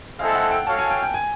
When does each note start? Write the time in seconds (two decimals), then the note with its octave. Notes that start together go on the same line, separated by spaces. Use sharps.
0.19 G#3 C4 E4 A4 F5
0.35 F#5
0.51 G5
0.66 F#4 A4 C#5 F5 A5
0.79 G#5
0.90 G5
1.03 G5
1.14 G#5